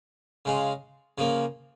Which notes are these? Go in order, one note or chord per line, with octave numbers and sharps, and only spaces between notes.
C#3 G#3 F4
C#3 F3 A#3